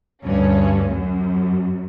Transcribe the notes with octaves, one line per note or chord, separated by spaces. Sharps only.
D2 G2 C#4
F#2